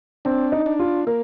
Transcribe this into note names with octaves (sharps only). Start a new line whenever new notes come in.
C4 D4
D#4
D4
F4
A#3 A#4